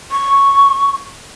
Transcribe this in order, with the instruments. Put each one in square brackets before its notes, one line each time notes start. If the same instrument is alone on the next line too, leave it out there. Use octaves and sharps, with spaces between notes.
[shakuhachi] C#6